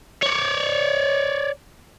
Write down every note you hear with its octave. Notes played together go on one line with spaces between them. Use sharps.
C#5 D5